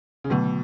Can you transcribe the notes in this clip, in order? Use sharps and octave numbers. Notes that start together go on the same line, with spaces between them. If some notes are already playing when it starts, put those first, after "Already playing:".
C#3
B2 D3 F#3 A3